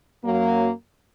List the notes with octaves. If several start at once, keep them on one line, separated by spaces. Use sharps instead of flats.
F#2 F#3 A#3